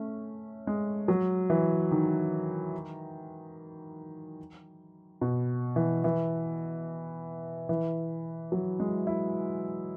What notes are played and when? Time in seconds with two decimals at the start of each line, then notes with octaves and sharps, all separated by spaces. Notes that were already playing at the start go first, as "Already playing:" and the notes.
Already playing: A3 C#4
0.67 G#3
1.08 F#3
1.50 E3
1.91 D#3
5.21 B2
5.76 E3
6.04 E3
7.69 E3
8.52 F#3
8.80 G#3
9.07 E4